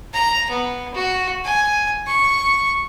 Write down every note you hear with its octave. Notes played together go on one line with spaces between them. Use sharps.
A#5
B3
F#4
G#5
C#6